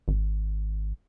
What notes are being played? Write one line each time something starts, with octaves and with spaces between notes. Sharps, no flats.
G#1